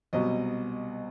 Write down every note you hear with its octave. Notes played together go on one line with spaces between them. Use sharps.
C2 B2 F#3 D#5